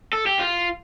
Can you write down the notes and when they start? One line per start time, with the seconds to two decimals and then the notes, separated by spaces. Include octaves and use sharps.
0.13 A4
0.27 G4
0.39 F4